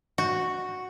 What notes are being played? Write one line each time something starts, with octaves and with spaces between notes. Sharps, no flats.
F#4